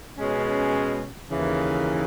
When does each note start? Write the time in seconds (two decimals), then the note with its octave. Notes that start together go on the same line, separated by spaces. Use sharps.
0.16 B2 G#3 C#4
1.30 D#2 C#3 E3